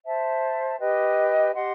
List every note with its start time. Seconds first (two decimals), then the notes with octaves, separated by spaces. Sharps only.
0.05 C5 E5 A5
0.79 G4 B4 D#5 G5
1.54 G4 D#5 F#5 C6